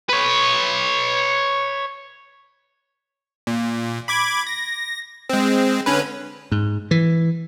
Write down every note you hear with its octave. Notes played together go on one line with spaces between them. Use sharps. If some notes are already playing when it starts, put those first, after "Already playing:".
B4 C#5
A#2
B5 D6 G#6
A#6
G#3 C4
D3 C#4 B4
G#2
E3